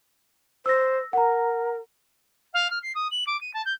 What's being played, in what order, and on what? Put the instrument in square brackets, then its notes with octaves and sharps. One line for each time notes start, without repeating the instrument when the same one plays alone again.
[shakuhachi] C5 [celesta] E6 A#6
[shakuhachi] A#4 [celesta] F#5 A#5
[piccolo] F5
F6
C7
D#6
F#7
D6
D#7
A5
G6